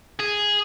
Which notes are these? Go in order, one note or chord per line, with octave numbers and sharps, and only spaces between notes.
G#4